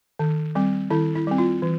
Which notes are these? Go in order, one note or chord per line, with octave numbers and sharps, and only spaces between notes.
D#3
G3 C4
D#3 E4
E4
G3 C4
F4
E3